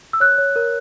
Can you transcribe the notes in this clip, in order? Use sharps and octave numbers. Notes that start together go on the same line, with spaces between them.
E6
C#5 F#6
C#5
A#4